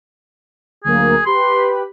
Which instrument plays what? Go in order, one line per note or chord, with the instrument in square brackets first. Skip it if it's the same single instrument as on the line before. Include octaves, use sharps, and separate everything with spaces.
[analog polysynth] D2 F#3 A#3 [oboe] G#4
[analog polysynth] G4 B4 B5 [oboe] C6